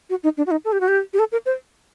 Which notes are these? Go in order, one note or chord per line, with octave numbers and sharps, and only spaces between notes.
F#4
D#4
D4
F#4
D#4
A4
G4
F#4
G4
G4
A4
A#4
C5